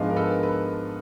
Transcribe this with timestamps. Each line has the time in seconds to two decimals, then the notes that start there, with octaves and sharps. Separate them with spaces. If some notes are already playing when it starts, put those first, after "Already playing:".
Already playing: G#2 F3 G#3 B3 D4 D#5 F5
0.10 A#4
0.16 A4 B4
0.43 A4 B4